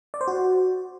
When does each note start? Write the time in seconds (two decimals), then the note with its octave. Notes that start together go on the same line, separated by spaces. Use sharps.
0.14 D5
0.21 C5
0.28 F#4